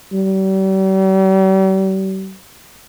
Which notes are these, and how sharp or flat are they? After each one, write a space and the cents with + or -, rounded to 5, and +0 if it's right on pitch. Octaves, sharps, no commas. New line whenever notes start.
G3 -40